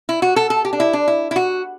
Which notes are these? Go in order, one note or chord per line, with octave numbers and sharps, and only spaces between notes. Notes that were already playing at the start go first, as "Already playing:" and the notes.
E4
F#4
A4
A4
G4
D4
E4
D4
E4
E4
F#4